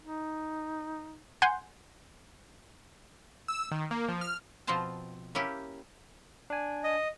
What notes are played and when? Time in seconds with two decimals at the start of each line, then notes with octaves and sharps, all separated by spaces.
0.02 D#4
1.42 F#5 G#5 C6 G6
3.48 E6
3.72 D#3
3.91 A#3
4.09 F3
4.21 F6
4.67 B2 F3 C4 F4 C5 A5
5.35 A#3 C#4 E4 G4
6.50 D4 G#5
6.84 D#5